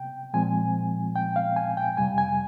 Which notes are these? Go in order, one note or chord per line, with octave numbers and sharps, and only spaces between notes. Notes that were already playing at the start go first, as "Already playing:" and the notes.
Already playing: C3 G5
A#2 F3 G#3 C4 G#5
G5
F5
G#5
G5
F2 C3 G3 G#5
G#5